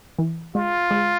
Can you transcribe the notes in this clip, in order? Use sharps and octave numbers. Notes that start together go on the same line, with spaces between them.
E3
G#3 F4
G#3